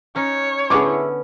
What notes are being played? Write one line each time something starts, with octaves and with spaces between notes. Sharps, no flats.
C#4 D#4 C#5
D3 B3 C#4 E4 G#4 D6